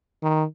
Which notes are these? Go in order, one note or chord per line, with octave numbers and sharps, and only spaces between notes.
D#3